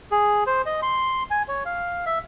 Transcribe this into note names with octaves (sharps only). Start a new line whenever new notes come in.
G#4
C5
D#5
C6
G#5
C#5
F5
E5